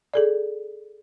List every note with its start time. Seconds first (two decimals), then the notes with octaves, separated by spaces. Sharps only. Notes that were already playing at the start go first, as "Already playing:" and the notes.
0.14 G#4 A4 D5